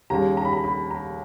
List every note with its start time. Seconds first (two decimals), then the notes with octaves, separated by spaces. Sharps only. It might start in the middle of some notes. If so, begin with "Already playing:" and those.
0.10 D#2 C#3 G3 A#5
0.37 A#5
0.45 B5
0.53 A#5
0.64 B5
0.91 A#5